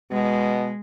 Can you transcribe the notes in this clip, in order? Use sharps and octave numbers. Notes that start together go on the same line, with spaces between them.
B2 G#3